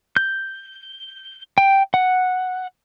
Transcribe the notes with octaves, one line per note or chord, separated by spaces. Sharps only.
G6
G5
F#5